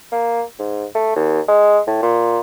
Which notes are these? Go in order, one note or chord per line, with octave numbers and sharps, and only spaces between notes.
A#3
G#2
A3
D#2
G#3
A2
A#2